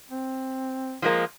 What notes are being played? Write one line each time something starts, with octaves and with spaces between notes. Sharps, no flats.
C4
F3 G#3 A#3